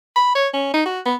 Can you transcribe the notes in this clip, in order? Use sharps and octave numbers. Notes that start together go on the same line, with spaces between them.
B5
C#5
C#4
D#4
F#4
B3